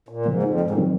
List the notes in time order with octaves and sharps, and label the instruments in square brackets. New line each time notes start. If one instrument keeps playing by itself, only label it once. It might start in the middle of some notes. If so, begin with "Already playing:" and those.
[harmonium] A#2
[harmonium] G#2 [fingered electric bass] C#3 F3 A#3
[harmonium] F2
G#2
A#2
[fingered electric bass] D#3 F#3 C4